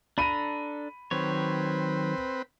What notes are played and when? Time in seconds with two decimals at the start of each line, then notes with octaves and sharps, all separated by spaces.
0.18 D4 A4 A#5 B5 D#7
1.11 D#3 F#3 C4 B4 C#5